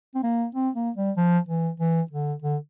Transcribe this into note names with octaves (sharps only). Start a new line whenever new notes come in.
C4
A#3
C4
A#3
G3
F3
E3
E3
D3
D3